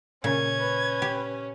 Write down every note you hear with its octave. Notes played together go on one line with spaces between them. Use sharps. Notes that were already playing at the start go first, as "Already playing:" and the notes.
A#2 C#3 C#4 G#6
B4
G4